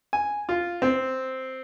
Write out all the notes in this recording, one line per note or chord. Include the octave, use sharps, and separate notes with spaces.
G#5
F4
C4